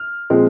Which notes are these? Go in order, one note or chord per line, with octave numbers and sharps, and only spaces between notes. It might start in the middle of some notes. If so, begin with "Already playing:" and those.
Already playing: F6
A#2 F3 G#3 C4